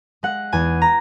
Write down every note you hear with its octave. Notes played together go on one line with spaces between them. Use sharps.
G#3 F#5
E2 G#5
A#5